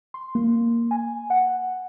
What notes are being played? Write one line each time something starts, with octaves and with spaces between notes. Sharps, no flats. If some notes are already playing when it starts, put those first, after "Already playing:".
C6
A#3
G#5
F#5